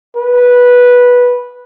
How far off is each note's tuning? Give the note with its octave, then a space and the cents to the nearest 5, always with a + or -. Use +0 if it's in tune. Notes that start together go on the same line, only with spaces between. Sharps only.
B4 -10